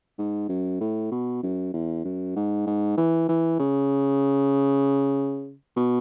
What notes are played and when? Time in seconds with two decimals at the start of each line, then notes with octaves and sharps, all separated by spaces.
0.18 G#2
0.49 F#2
0.81 A2
1.12 B2
1.43 F#2
1.74 E2
2.04 F#2
2.36 G#2
2.67 G#2
2.97 E3
3.29 E3
3.59 C#3
5.76 B2